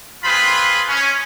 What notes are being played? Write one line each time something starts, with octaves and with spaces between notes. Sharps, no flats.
C4 F4 G#4 B4 B5 C6
C#4